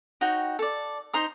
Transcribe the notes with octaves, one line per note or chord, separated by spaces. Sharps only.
D#4 F#4 C#5 G5
A4 D5
D#4 C5 A#5 D#6